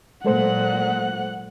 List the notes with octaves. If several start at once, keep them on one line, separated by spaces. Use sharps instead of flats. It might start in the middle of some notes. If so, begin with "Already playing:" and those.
A#2 F#3 G#3 A4 C5 F#5 F#6